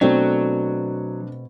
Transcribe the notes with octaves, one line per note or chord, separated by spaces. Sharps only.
B2 F#3 A3 C4 D4